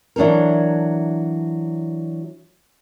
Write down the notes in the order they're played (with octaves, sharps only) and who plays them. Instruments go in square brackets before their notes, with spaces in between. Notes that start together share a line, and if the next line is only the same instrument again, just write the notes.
[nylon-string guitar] E3 F#3 D4 A4 A#4